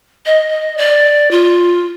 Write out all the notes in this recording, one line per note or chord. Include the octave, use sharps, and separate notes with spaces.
D#5
D5
F4